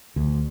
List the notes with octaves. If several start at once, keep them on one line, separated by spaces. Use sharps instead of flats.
D2